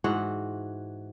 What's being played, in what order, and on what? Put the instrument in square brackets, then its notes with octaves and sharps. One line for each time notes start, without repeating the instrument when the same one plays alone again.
[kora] G#2 E3 F#4 F#5